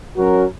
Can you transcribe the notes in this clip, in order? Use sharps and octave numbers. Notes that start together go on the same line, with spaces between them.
F#3 C#4 F#4 A#4